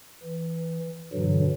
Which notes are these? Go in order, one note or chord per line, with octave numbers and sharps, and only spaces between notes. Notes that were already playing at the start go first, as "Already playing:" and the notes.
E3
G2 B2 D3 E3 F#3